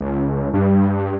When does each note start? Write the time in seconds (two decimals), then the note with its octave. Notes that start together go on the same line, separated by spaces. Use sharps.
0.01 C#2
0.54 G2